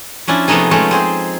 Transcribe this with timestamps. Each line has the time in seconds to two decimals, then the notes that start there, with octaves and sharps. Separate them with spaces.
0.28 F3 C#4 D4 E4
0.48 C3 F3 A3 B3 D#4 G#4
0.71 F3 G#3 A3 C#4
0.91 C4 G#4 C5